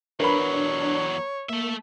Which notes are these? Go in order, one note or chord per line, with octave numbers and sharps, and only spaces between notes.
E2 F#3 D4 A#4 B4 C#5 B5
A3 A#3 E5